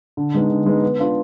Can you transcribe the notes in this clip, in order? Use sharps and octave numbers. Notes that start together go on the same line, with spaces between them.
D3
G#3 B3 D#4
D3
G#3 B3 D#4
B3
D4 F4 B4